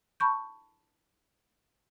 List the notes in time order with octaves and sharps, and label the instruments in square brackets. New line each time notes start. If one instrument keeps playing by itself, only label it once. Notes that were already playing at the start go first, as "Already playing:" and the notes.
[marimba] A5 B5 C#6 G6